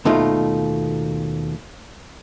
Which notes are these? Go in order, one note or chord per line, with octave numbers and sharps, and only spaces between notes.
D#2 B2 A3 D#4 F4